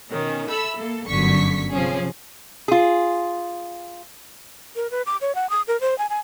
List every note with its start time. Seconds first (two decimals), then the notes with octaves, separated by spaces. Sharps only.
0.11 B2 D#3 C#4
0.49 A4 E5 B5 E6
0.78 A#3 A4
1.08 G1 F#2 D3 C#6 B6
1.74 C3 F3 C#4 G#4
2.68 F4 G#4
4.76 A#4
4.91 B4
5.06 D6
5.21 C#5
5.35 F#5
5.50 D#6
5.68 A#4
5.81 C5
5.98 G#5
6.10 G#5